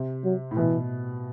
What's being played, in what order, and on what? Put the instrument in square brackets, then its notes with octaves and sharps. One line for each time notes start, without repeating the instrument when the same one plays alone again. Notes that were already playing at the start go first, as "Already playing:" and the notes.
Already playing: [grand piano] C3
[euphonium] F#3
[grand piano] A2
[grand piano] B2 [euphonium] E3